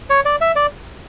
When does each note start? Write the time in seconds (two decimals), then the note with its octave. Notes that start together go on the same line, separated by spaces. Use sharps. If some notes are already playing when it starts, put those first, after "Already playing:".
0.10 C#5
0.25 D5
0.41 E5
0.56 D5